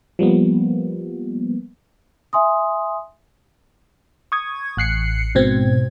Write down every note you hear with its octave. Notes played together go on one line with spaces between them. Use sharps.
F3 G3 A#3 B3
E5 G#5 C6 D#6
C#6 D#6 G#6
A1 F#6 C7 C#7
G#2 B2 C4 G#6